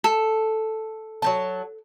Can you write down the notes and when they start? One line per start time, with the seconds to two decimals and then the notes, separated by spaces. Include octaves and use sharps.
0.04 A4
1.22 F#3 G3 A5